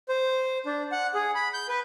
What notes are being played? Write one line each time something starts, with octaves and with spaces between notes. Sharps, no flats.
C5
D4
F#5
G#4
B5
G6
B4